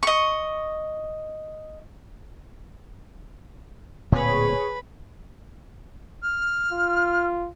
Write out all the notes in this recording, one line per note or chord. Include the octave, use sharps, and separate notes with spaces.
D#5 C#6
D1 A#2 C4 G#4 B4 C#5 B5
F6
F4